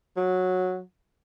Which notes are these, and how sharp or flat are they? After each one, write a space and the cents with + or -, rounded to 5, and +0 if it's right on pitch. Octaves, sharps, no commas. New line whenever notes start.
F#3 -10